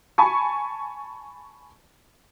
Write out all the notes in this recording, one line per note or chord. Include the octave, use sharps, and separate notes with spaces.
G#5 A5 B5 C#6